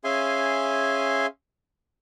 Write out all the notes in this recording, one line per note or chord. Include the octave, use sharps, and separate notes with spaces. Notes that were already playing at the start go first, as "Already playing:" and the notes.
C#4 G#4 E5 F5 G#5 C6